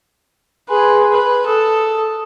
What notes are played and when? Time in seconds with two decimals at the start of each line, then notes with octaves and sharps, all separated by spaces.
0.69 G#4 B4 G#5 C6
1.12 B4
1.46 A4 D#6